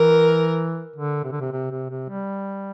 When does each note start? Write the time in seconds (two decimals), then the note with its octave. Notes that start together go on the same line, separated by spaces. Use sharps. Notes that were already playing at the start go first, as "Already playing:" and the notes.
Already playing: E3 A#4
0.96 D3
1.24 C3
1.32 D3
1.41 C3
1.52 C3
1.71 C3
1.90 C3
2.09 G3